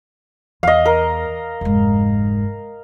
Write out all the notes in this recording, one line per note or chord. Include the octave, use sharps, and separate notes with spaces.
E2 D#5 F5
A#4
F1 G#2